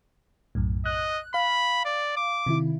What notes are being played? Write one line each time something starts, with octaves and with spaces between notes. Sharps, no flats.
B1 F#2 A2
D#5 F#6
F5 B5
D5
D6
C3 D#3 E4